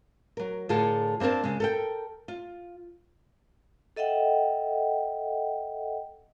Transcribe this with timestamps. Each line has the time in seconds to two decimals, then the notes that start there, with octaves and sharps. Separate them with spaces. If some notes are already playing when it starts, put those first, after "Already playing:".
0.37 F#3 A#4
0.69 A2 D3 F4 G#4 A#4 A5
1.20 A#3 C4 D4 A#4 A5
1.43 C#3 G#3
1.60 A4 A#4 G5
2.28 F4
3.96 A4 D#5 E5 F#5 G5